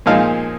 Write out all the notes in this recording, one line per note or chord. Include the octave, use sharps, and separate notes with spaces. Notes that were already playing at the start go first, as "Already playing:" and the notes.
A#2 F3 G#3 D#4 F5